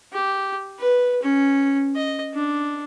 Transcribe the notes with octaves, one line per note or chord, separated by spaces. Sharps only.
G4
B4
C#4
D#5
D4